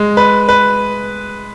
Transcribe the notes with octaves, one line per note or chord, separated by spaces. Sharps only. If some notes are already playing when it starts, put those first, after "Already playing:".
Already playing: G#3
B4
B4